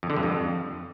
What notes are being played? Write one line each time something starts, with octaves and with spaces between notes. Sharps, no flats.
F2
D3
G2
F2